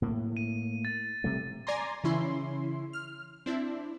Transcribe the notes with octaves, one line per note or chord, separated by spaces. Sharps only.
A2 A#3
D#7
A6
C3 G3 A3
D5 G#5 A#5 C6
C#3 E3 C#4 E4 C6
F6
C4 D4 E4